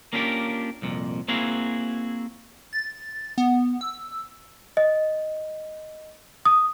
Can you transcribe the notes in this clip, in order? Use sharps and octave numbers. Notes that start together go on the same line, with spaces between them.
A#3 C#4 D4 F4 G4 A#4
C2 F2 A#2
A#3 C4 E4 F#4 G#4 F5
A6
B3
E6
D#5
D#6